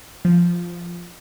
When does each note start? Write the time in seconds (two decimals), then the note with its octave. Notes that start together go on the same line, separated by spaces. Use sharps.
0.25 F3